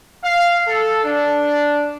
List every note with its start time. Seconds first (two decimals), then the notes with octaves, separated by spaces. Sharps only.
0.24 F5
0.67 A4
1.04 D4